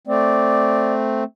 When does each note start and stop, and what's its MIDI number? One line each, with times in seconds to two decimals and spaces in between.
0.07 1.24 57
0.07 1.24 60
0.07 0.94 74